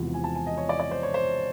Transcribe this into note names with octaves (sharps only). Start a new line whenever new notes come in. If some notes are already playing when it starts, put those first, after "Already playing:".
Already playing: E1 E2 C3 F3
G#5
A5
G#5
D#5
C#5
D5
D5
C5
C#5
C5